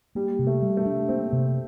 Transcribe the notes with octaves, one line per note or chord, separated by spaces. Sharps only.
G3 A#3
C3
A3
G3
A3
D4
A#3 C4
C3